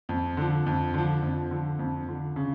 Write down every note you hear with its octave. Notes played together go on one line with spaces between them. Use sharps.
F2
D3 F3
F2
D3 F3
F2
D3 F3
F2
D3 F3
C#3